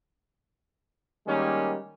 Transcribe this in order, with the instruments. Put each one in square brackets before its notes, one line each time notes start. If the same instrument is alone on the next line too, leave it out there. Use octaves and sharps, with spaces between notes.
[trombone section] D#3 G3 G#3 A#3 C#4